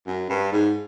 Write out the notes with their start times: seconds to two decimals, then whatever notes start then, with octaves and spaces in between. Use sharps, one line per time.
0.07 F#2
0.29 G2
0.52 G#2